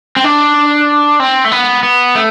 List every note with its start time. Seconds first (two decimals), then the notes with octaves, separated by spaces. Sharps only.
0.16 C4
0.24 D4
1.20 C4
1.44 A3
1.52 B3
1.83 B3
2.15 A3